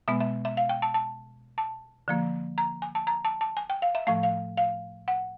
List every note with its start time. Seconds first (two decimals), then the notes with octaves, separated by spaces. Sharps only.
0.08 B2 G#3 B3 E5
0.20 E5
0.45 E5
0.57 F5
0.69 G5
0.82 A5
0.94 A5
1.58 A5
2.08 D3 F3 A#3
2.58 A#5
2.82 G#5
2.95 A5
3.07 A#5
3.25 A5
3.41 A5
3.57 G#5
3.70 G5
3.82 F5
3.95 E5
4.07 A2 F3 A3 F5
4.23 F5
4.57 F5
5.08 F#5